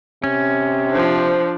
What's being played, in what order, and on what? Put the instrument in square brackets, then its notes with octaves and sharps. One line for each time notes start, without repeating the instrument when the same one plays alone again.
[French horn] C3 [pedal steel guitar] C#4
[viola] F3 D4 [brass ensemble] C5